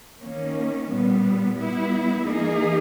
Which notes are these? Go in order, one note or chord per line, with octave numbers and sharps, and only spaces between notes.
D#3 A#3 C#4
A#2 G3 B3
G3 B3 E4
E3 A#3 D#4 G#4